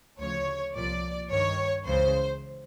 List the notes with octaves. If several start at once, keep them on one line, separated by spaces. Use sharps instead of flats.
D2 C#3 F3 C#5
C2 A#2 F3 D5
G2 D#3 C#5
C#2 C#3 E3 C5